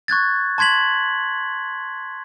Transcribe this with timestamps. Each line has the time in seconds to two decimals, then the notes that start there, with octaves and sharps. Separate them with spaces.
0.08 C#6 F#6 G#6 A6
0.58 A5 C6 G#6 B6 F#7